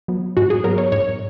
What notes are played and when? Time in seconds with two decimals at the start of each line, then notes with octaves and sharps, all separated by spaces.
0.08 F#3 B3
0.37 G#2 F#4
0.50 G#4
0.64 F#3 B3 A#4
0.78 C#5
0.92 G#2 C#5